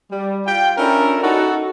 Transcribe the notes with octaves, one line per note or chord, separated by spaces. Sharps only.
G3
F4 G5
C#4 D4 E4 F4 A4 A#4
D#4 F#4 A4